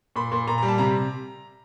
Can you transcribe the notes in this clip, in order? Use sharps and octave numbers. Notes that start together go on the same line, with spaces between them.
A#2 B5
A#2
A#2 A#5
A#5
G3
A5
C3 A#5